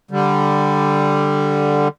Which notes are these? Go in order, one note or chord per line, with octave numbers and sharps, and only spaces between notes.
D3 G3